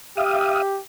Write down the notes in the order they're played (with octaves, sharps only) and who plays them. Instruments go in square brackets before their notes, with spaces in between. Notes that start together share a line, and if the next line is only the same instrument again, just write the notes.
[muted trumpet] G4 [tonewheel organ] E5 F5 D#6